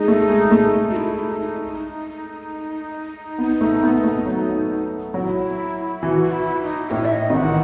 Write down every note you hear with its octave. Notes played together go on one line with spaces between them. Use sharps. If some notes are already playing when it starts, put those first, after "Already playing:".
Already playing: G#3 D#4
A3
G#3
A3
F#4
E4
D#4
D#4
D#4
B3
A3
B3
A3
F#3
F#3 E4
E3 F#4
F#4
E4
D#4
A2 C#5
E5
D#5
D#3
E3 F#5